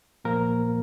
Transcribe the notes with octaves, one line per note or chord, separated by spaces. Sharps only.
A#2 F3 A#3 A#4